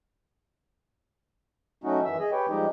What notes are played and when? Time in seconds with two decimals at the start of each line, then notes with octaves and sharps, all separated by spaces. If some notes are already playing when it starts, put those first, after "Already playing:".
1.84 F#3 A3 C#4 D#4 F#4
2.05 F#2 D#3 E3 E5 E6
2.19 G#4 D#5
2.32 G4 B4 C#5 G5
2.49 F3 G3 G#3 D#4 G4